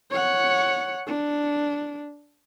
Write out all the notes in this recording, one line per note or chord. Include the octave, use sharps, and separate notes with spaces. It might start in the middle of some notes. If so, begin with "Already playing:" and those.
C#5 F#5
D4